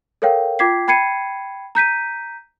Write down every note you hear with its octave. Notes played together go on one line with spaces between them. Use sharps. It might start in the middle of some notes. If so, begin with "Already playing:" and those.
A4 A#4 C#5 F5 G5
F4 G5 D6 G#6 B6 C7
G5 B5 G#6 C7 C#7 D#7
A#5 G6 B6 D#7